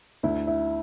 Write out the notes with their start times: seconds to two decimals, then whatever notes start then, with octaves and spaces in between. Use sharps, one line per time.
0.23 D2 E4
0.47 E4